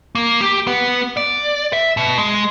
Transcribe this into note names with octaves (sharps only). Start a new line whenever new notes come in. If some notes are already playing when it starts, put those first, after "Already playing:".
A#3
G4
B3
D5
E5
B2
G#3